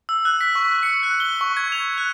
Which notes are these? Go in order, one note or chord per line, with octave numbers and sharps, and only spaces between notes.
E6
F#6
B6
C#6
C#7
F#6
G7
C#6
G#6
F7
F#6